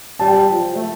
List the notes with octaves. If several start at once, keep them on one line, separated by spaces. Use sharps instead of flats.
G3 A5
G5
A5
F3
A3